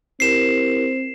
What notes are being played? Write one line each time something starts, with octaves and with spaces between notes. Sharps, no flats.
C4 E4 G4 A#4 C7 E7